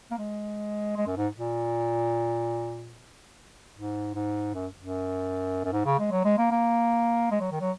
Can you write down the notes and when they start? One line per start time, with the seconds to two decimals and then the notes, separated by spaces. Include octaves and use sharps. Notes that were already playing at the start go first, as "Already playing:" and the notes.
0.11 A#3
0.18 G#3
0.97 G#3
1.07 F#2
1.17 G#2
1.38 A#2
3.75 G#2
4.15 G#2
4.54 F#2
4.79 F#2
5.65 F#2
5.73 G#2
5.86 C#3
6.00 G#3
6.12 F#3
6.25 G#3
6.38 A#3
6.51 A#3
7.31 G#3
7.40 F#3
7.51 D#3
7.61 F#3